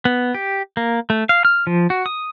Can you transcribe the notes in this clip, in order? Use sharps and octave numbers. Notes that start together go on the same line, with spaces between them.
B3
G4
A#3
A3
F5
F6
F3
F#4
D#6